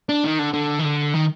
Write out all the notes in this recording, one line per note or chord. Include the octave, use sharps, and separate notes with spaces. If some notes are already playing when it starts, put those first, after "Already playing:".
D4
D#3
D3
D3
D#3
D3
D#3